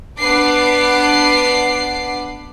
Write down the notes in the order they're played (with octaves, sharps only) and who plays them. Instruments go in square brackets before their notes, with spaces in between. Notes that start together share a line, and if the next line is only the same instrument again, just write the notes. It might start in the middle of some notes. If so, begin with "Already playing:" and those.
[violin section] B3 D4 B4 F#5 D6 C7